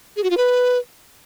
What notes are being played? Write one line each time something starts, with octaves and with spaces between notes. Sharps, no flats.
G#4
F#4
F4
B4